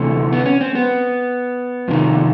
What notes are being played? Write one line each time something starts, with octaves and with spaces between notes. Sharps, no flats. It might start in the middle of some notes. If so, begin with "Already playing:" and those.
Already playing: D2 C3 E3 A3
B3
C#4
C4
B3
F2 C3 D#3